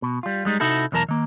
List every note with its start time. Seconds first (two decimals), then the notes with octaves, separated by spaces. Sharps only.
0.02 B2
0.23 G3 F4
0.45 G3 G#3 D#4
0.60 C3 D#4 E4 F#4 A4
0.92 B1 E2 E3 A#4 A5 A#5
1.09 D#3 A#3